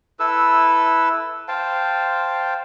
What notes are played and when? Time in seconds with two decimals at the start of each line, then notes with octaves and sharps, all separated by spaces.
0.19 E4 A4 B4 E6
1.48 C5 F5 G5 A5